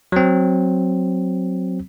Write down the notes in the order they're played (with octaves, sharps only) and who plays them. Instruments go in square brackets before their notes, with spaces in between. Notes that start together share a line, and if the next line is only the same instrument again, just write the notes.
[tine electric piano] F#3 C4